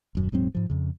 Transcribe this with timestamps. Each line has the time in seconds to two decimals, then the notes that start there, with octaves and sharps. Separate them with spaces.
0.15 D#1 F#2
0.32 D#1 G#2 F#3 C4
0.55 G#2 F3
0.70 F2 C#3